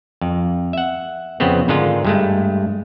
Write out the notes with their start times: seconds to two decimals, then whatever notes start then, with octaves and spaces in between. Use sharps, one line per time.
0.21 F2
0.73 E5 F#5
1.40 F2 C#3 B3 C4
1.68 G#2 D3 D#3 G#3 F4
2.05 G2 G#3 A3